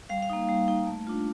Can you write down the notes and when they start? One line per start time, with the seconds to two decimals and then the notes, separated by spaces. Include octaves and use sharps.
0.09 G3 F5
0.22 F5
0.30 A#3 D#4
0.49 G3
0.68 A#3 D#4
0.87 A3
1.07 D4 F4